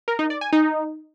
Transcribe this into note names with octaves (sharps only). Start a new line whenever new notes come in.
A#4
D#4
D5
G#5
D#4